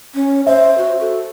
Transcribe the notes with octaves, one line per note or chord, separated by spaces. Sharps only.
C#4
C5 E5
F#4
A4